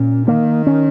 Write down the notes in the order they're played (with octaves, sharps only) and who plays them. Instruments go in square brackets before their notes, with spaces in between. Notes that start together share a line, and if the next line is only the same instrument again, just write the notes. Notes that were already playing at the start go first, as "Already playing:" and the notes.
Already playing: [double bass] A#2 [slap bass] C#4
[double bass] D#3 [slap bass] A#3
[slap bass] C#4